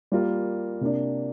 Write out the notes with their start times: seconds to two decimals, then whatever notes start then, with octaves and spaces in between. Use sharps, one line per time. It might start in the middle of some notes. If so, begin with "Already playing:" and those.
0.12 G3 A#3 F4 A#4
0.81 C3 A#3 D4